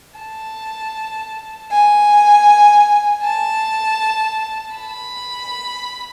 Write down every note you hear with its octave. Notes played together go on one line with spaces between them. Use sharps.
A5
G#5
A5
B5